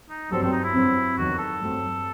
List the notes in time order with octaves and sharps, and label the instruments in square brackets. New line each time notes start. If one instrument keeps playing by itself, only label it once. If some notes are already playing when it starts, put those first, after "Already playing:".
[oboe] D#4
[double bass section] G2 F#3 C4 [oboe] A4
[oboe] A4
D#4
E4
[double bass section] G2 F#3 C4
[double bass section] E2 D#3 F#3 [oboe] F#4
[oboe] A4
[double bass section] G2 F#3 A3 C4